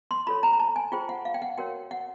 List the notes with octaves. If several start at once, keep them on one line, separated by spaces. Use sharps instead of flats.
C6
F4 A4 C#5 B5
A#5
A#5
A5
G#5
F4 G#4 C5 G5
F#5
F5
G5
F#5
F#4 A#4 C#5 G5
F#5